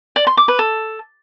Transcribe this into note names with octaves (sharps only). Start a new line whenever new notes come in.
D5
C6
D6
B4
A4